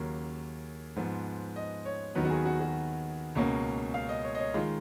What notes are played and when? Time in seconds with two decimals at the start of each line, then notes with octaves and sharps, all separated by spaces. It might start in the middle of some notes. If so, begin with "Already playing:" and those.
Already playing: D#2 C#3 F#3 A#3 C#4
0.96 G#2 F3 B3
1.56 D#5
1.85 C#5
2.15 D#2 D#3 F#3 B3 B4
2.25 F#4
2.30 G#4
2.45 F#4
2.61 F#4
3.35 C#2 B2 A#3 C#4
3.94 F5
4.09 D#5
4.24 C#5
4.35 D#5
4.39 C#5
4.54 D#3 G#3 F4